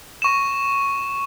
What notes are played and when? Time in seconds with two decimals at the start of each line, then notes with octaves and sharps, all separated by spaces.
0.22 C#6 E7